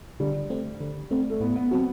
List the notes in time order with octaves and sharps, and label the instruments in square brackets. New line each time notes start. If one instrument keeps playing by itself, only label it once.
[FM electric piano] D3 [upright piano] G3
[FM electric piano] A3 C4
D3
A3 C4
[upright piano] A3
[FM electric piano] A2 [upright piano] B3
[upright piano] B3
[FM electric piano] F#3 C4 F#4